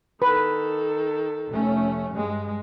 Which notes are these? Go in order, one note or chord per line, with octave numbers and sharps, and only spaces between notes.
D#3 A4 B4
F1 A3 C#4
G2 G#3